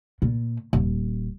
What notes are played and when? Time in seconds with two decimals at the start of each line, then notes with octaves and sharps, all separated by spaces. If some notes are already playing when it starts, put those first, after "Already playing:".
0.22 A#2
0.73 D#1